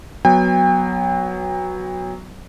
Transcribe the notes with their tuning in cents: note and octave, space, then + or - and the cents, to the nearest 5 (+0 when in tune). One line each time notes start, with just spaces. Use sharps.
F#3 +0 B3 +0 G5 +45